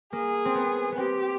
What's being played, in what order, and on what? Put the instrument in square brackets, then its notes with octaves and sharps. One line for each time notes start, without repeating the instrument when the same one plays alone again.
[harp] A#3 [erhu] G#4
[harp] C4
B3
B3
[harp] C4 [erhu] G4